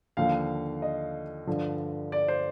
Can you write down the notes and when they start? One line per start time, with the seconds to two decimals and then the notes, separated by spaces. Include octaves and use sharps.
0.17 D#2 D3 F3 F5
0.82 D#5
1.47 G2 D3 F3
2.12 D5
2.28 C5